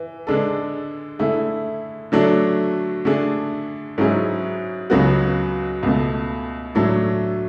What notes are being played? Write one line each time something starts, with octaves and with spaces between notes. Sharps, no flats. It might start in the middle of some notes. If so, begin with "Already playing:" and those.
Already playing: E3
D3 G#3 D4 A4
D3 A3 E4 G#4
D3 F#3 A3 D4
D3 A3 D4 G#4
G#2 F#3 C#4 E4 G#4
C#2 C#3 F#3 B3 F#4
C#2 B2 A3
A2 F#3 A3 D4 A4